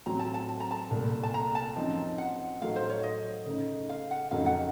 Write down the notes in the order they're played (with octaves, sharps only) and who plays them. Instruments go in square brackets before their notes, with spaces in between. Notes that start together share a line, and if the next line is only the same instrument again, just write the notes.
[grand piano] A2 F#3 C4 [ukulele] A#5
[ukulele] A5
A5
A5
A#5
A5
[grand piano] C2 A#2 A3
[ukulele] A5
A#5
A5
[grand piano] F#2 F3 C4 D#4
[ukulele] F#5
[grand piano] A2 F#3 A3 D#4 [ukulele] F5
[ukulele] C5
C#5
D#5
[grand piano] C#3 A3 D#4
[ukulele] F5
F#5
[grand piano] F2 C#3 F#3 A3 D#4 [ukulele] F5
[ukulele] F#5